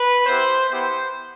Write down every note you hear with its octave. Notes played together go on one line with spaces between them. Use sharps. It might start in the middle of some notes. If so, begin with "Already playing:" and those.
Already playing: B4
B3 E4 G4 C5
B3 E4 G4 C5